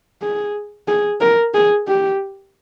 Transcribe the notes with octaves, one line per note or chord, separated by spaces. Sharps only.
G#4
G#4
A#4
G#4
G4